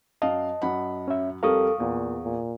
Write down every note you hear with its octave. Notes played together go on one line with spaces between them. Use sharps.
F#2 D#5 F5 A5
F#2 F#5 B5
C#4 E5
F2 G3 A4 A#4 F5 C#6 D#6
E2 A#2
A#2